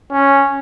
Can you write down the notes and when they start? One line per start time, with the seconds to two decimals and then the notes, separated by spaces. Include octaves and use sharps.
0.12 C#4